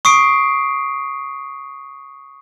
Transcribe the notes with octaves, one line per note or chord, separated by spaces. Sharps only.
C#6 D#6 C7 D7